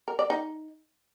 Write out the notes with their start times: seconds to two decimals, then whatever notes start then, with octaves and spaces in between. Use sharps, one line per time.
0.08 A#4
0.19 D5
0.30 D#4